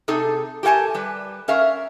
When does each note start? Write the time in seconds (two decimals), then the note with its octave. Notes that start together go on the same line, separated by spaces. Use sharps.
0.08 C3 D#4 G#4 A4
0.63 G4 A4 A#4 F#5 G#5 A5
0.94 G3 B4
1.48 C#4 A#4 E5 F5